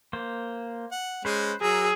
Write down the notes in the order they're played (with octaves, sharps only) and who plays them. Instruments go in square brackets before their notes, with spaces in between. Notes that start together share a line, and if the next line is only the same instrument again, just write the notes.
[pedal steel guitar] A#3 C5
[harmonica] F#5
[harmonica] G#3 C#4 G#4 [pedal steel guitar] B4 C5
[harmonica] F#3 E6 [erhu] G#4 [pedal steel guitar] A#4